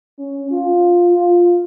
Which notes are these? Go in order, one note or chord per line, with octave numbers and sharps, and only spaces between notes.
C#4
F4
F4